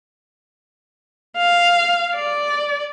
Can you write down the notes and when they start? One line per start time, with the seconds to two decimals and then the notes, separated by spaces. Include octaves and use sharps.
1.38 F5
2.16 D5